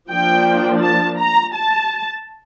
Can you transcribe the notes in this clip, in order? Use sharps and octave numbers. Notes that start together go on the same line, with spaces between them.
F3 A#3 D4 G5
A5
A#5
A5